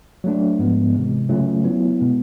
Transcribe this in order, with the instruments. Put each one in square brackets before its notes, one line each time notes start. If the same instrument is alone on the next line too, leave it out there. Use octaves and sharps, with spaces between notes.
[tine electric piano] F#3 A3 D4
G#2 F3 G#3 B3
C3 E3 G#3
C#3 F#3 A3 C#4 F4
F#3 B3 E4
B2 G#3 B3